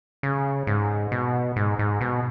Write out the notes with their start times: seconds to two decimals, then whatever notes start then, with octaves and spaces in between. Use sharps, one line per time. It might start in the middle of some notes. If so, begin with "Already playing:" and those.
0.23 C#3
0.67 G#2
1.12 B2
1.56 G#2
1.79 G#2
2.01 B2